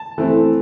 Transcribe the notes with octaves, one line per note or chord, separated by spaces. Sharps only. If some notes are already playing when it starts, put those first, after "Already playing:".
Already playing: A5
E3 A3 C4